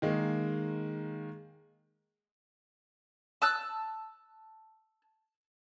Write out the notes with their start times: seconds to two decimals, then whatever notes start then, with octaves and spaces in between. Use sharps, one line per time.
0.02 D#3 G#3 A#3
3.42 A5 E6 F#6